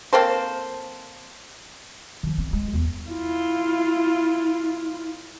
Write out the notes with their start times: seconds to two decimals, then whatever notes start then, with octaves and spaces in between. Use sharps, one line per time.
0.13 A#3 C4 A4 C5
2.23 D#3 F3
2.38 C4
2.53 G#3
2.74 E2
3.09 E4 F4